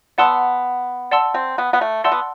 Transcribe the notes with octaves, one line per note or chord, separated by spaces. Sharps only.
B3 D5 F#5 A5 C6 E6
D5 F#5 A5 C6 E6
C4
B3
B3
A3
A3 D5 F#5 A5 C6 E6
B3